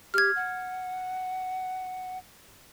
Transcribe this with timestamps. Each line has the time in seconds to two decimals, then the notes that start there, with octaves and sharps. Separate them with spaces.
0.14 G4 F6 G#6
0.36 F#5